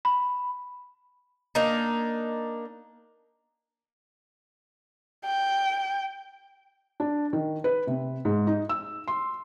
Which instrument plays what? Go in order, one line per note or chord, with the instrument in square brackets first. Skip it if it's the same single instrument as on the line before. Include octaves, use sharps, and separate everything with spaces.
[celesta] B5
[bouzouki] A#3 D4 D#4
[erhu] G5
[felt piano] D4
D#3
B4
C3
G#2
D#4
E6
C6